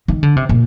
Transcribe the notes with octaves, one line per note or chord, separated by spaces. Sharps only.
D#3
D3
C3
A#2